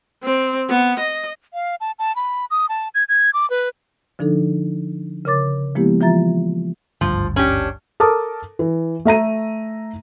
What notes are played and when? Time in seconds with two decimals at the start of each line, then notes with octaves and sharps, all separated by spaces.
0.24 C4
0.70 B3
0.99 D#5
1.54 F5
1.81 A5
1.99 A5
2.16 B5
2.51 D#6
2.69 A5
2.95 G#6
3.09 G#6
3.34 D6
3.50 B4
4.19 D3 F3 D4 D#4 A4
5.25 C#3 A#4 C#5 D6 A6
5.75 F3 G#3 A#3 B3 E4 G4
6.01 E3 F3 F4 E5 A#5 A6
7.01 G#1 D2 G2 F3
7.36 C#4 D4 G4
8.00 A4 A#4 A5 D6 D#6
8.59 E3
9.05 A3 E5 A#5 D#7